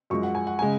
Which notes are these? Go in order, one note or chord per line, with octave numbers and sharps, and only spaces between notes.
F#2 F3 G#3 C#6
F#5
G#5
F#5
C#3 G#3 G#5